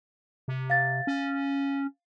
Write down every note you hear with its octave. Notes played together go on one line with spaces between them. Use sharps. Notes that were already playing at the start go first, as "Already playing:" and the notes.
C3
F5 A6
C#4